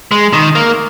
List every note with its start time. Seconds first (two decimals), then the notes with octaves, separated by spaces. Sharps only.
0.11 G#3
0.33 D#3
0.55 A#3